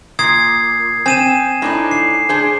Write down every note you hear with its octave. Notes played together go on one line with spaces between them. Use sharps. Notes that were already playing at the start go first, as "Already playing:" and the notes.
A#2 D#6 G#6 C7
C4 G#5 D#7 E7
A2 D4 D#4
C7
D4 G#4 C5